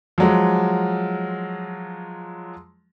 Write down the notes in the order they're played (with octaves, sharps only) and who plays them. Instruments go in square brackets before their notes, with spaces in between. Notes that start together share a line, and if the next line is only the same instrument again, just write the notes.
[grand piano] F3 F#3 G#3